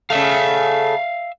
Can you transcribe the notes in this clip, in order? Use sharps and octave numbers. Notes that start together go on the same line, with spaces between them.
C#3 A3 E5 F5